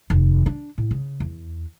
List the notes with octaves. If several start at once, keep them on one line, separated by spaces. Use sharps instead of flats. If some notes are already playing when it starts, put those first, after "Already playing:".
F1 D#2
D4
A2
C#3
E2